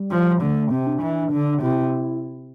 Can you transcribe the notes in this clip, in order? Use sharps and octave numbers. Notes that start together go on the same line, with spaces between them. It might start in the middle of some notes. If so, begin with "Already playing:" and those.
Already playing: G3
F3
D3 A3
C3 C4
D4
E3
D3
C3 E4